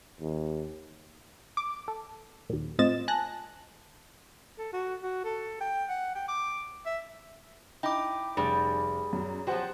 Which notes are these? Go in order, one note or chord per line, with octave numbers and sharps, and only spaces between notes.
D#2
D6
A4
D#2 A#2
A2 C4 F4 D#5 A6 E7
G#5 A5 F#6 A#6
A4
F#4
F#4
A4
G5
F#5
G5
D6
E5
D#4 E4 G5 D6
F1 G3 C#4 G#4 D5
F#2
F3 F#3 G4 C5 F#5